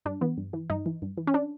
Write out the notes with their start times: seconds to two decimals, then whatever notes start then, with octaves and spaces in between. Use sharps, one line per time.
0.05 G2 D4
0.21 E3 B3
0.37 G2
0.53 E3
0.70 G2 D#4
0.86 E3
1.02 G2
1.17 E3
1.27 C#4
1.34 D4